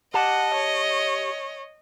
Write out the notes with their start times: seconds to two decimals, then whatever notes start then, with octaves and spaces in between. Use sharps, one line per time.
0.14 G4 D#5 F#5 A5
0.54 C#5